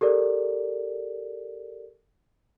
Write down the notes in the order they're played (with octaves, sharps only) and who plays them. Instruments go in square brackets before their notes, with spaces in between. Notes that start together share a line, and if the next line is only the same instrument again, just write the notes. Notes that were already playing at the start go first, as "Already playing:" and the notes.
[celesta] G4 A4 A#4 D5